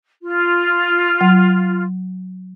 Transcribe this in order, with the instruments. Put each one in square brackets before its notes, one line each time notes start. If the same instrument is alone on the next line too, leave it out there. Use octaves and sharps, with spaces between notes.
[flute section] F4
[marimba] F#3